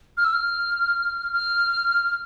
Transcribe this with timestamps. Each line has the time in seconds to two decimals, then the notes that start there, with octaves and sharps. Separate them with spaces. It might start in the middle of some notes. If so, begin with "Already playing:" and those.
0.17 F6
0.24 E6
0.33 F6
1.33 F6